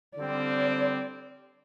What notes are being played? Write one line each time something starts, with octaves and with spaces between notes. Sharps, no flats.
D3 G3 C4 D5